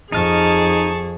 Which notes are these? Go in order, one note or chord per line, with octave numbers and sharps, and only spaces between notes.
F2 D#4 G#4 A5 C#6 F6